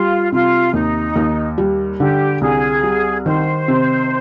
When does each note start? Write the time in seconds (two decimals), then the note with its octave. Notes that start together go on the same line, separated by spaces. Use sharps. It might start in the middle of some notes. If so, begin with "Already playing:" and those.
Already playing: G3 F4
0.32 C3 F4
0.73 D#2 D#4
1.16 D#2
1.58 G3
2.00 D3 G4
2.41 C2 G#4
2.83 G3
3.25 D#3 C5
3.68 C3